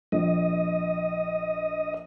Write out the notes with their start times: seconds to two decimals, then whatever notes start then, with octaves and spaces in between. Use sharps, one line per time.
0.12 A#1 D#5